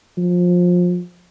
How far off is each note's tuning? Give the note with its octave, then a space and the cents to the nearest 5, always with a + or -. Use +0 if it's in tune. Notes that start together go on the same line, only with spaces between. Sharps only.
F3 +25